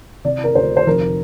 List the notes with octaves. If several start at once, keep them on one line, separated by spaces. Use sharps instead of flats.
C3 D5
A#4
D2 C5
C5
F1 A#4